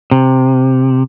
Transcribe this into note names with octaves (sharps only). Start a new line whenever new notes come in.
C3